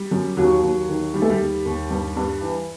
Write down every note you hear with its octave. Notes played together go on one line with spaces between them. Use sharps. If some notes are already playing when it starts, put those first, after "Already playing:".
Already playing: G3
F#2
D#2 F#3
D#2
D#3
D#3 G3
A3
G3
D#2
D#2
G2
G2
E3